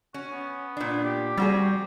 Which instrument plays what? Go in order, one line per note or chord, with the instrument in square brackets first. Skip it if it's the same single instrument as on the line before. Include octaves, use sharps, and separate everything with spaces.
[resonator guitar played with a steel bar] C#4 [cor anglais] F#4
[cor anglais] B3
[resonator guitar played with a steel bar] A#2 D4
[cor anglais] G4
[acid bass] G3 [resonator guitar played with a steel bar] C4 F#4 G#4